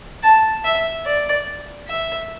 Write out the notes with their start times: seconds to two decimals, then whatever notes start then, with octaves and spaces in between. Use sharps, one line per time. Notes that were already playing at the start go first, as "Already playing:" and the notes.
0.23 A5
0.64 E5
1.06 D5
1.89 E5